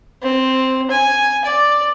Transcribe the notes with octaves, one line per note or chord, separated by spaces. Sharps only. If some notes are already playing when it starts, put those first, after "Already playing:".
C4
G#5
D5